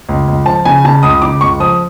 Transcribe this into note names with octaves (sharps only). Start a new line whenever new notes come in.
C#2
C#2
F3 A5
C#3 G#5
C#3 A5
C#2 D#6
C#3 D6
C#2 C#6
F3 D#6